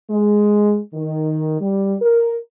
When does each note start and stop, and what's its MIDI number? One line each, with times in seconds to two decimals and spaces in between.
0.10 0.78 56
0.94 1.57 51
1.60 1.95 55
2.01 2.35 70